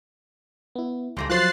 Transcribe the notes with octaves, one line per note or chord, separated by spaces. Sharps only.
B3 E4
C#2 G#2 G3 A3 C6 A#6
F3 F#3 F4 C5 F#6 A6 C7